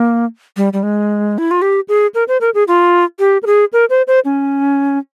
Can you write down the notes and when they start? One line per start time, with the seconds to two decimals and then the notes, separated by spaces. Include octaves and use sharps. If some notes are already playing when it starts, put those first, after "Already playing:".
Already playing: A#3
0.57 G3
0.73 G3
0.83 G#3
1.38 E4
1.51 F4
1.62 G4
1.88 G#4
2.15 A#4
2.28 C5
2.41 A#4
2.54 G#4
2.68 F4
3.19 G4
3.43 A#4
3.46 G#4
3.73 A#4
3.90 C5
4.07 C5
4.25 C#4